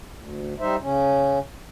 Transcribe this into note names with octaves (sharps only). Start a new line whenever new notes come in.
D2
G3 D#4 C5 E5
C#3 C#4